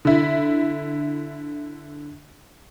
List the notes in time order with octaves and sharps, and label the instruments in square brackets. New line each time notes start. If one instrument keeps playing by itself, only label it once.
[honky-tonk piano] D3 E4